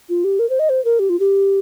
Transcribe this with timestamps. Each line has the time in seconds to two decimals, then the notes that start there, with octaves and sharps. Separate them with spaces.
0.09 F4
0.24 G4
0.39 A#4
0.49 C5
0.59 D#5
0.69 C5
0.85 A#4
0.99 G4
1.09 F4
1.20 G4